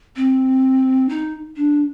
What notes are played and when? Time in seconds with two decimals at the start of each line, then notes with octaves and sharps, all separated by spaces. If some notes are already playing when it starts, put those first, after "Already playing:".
0.16 C4
1.09 D#4
1.56 D4